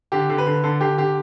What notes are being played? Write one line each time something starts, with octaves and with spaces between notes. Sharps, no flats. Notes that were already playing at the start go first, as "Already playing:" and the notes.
D3 G4
D3
B4
D3
D3 A4
D3 G4
D3 G4